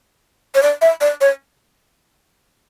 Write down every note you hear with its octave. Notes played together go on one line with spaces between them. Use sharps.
C#5
D5
E5
D5
C#5